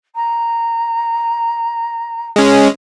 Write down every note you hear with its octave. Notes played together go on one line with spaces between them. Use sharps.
A#5
G#3 C#4